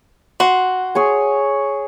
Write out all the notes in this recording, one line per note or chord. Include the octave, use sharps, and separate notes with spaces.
F#4 C6
G#4 C#5 G#5